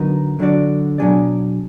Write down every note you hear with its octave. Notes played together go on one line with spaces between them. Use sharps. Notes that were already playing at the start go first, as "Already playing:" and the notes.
Already playing: D3 F#3 B3 D#4 A#4
D3 F#3 D4 F#4 D5
B2 F#3 D4 G#4 D5